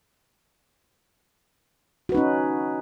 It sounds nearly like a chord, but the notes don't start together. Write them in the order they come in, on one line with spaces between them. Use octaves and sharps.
F#4 B4 D#4 C#4